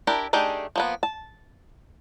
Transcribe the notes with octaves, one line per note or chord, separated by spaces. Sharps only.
D4 E4 G4 A#4
A3 D4 D#4 G4 G#4
F3 A#3 B3
A5